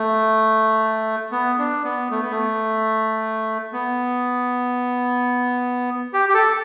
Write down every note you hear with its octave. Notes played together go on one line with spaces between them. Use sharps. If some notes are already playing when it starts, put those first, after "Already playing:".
Already playing: A3
B3
D4
B3
A3
B3
A3
B3
G4
G4
A4